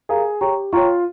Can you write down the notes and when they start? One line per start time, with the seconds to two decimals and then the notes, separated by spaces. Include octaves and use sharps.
0.09 G4 G#4 A#4 F5 A#5
0.41 G4 C#5 G5 A#5 C#6
0.73 F4 C#5 G5 A#5 C#6